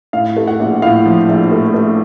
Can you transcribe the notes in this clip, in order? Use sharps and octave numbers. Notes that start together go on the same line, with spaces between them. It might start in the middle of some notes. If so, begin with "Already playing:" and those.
A2 F5
A3
F#5
A#1
A2 F5
F3
A#1
A3
A3